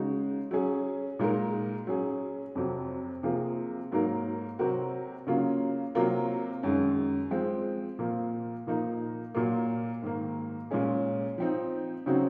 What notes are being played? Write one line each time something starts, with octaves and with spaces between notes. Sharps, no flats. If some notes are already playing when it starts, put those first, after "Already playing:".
Already playing: C#3 G#3 D#4 F#4
F#3 C#4 G#4
A#2 G#3 D#4 A#4
F#3 C#4 G#4
F2 C3 F#3
C3 F3 A#3 F4 G#4
G#2 F#3 A#3 D#4 A#4
C3 F#3 C4 F#4 A#4
C#3 F#3 A#3 F4
C3 F#3 A#3 F4 A#4
F#2 D#3 G#3
F3 G#3 C4
A#2 F3 A#3
A#2 F3 A#3 D#4 A#4
A#2 F#3 A#3
G#2 D#3 A#3
A#2 G#3 C#4 G#4
F3 C4 D#4
C#3 F#3 C4 D#4 F#4